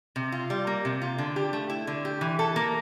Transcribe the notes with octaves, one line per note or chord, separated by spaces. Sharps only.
C3
F4
G3
A#3
C3
F4
D3
G4
A3
E4
D3
G4
E3
A4
A#3